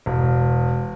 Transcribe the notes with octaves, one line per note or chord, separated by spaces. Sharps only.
E1